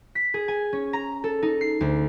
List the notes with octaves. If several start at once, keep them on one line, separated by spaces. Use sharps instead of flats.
B6
G#4
G#5
C#4
A#5
A4
D#4
C7
D2